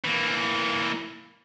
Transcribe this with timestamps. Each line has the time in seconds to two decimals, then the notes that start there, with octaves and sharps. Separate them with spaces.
0.05 E3 A#3